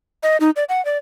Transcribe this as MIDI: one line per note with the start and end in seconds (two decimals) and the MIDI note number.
0.23 0.37 75
0.40 0.50 63
0.56 0.64 74
0.69 0.83 78
0.85 0.98 74